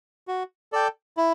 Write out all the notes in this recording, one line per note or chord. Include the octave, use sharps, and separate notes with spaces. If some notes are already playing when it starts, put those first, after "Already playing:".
F#4
A4 D5 G5
E4